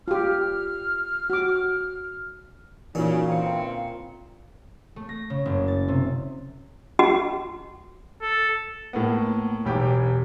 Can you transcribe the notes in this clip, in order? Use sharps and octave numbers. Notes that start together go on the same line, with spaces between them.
F4 G4 F6
F#4 D6
A#2 C#3 E3 C#4 D#4 F#4 C#6
D3 E3 C4 F5 G5 A#5 C#7
A3
A#6
C#3
F#1
A6
C3
F#4
A4
A2 A#3 B3
E1 B1 G4